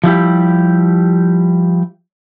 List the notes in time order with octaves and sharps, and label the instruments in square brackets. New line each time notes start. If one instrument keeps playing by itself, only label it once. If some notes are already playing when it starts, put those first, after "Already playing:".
[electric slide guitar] F3 G3 E4 G4